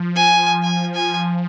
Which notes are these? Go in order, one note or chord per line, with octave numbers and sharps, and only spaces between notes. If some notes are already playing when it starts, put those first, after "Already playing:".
Already playing: F3
G#5
G#5
G#5